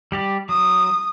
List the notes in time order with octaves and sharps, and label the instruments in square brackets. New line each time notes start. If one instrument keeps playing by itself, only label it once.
[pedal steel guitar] G3 G4 D5
[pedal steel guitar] F#3 [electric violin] D#6